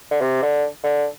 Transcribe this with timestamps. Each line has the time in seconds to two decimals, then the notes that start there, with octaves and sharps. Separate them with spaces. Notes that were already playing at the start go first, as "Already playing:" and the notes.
0.11 D3
0.21 C3
0.42 D3
0.84 D3